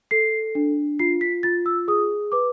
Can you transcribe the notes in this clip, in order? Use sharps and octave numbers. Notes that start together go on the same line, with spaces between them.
A4 C7
D4
F4 C7
B6
F4 A6
E6
G#4 D#6
B4 D6